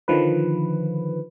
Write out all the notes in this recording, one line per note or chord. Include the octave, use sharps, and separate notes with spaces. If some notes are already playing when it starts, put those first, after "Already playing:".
D3 D#3 F3 B4